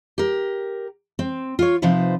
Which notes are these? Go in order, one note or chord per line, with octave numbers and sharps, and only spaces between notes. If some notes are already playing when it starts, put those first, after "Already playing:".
G4 A#4
C4
F4 C#5
C3 F3 D#4 B4 C5